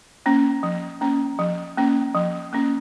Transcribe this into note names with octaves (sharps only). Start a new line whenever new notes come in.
A#3 C#4
F3
A#3 C#4
F3
A#3 C#4
F3
A#3 C#4